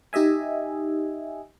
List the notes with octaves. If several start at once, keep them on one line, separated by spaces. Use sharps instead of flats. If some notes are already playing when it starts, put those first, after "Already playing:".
D#4 G4 D#5 E5 G#5